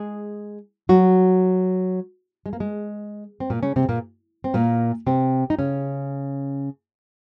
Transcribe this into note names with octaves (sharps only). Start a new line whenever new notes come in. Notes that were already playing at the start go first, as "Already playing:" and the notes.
Already playing: G#3 G#4
F#3 F#4
G#3
A#3
G#3
C4
A#2 A#3
C#3 C#4
C3 C4
A#2 A#3
C4
A#2 A#3
C3 C4
D#4
C#3 C#4